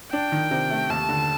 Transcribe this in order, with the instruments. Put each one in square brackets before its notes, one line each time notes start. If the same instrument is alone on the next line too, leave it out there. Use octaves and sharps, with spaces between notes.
[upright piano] D4 [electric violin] G5
[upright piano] D#3
C3
A3
[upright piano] D#2 [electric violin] A5
[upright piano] D3